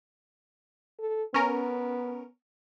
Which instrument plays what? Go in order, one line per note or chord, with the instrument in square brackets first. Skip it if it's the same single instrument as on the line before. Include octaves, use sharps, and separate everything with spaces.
[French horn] A4
[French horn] B3 [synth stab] C#4 A#4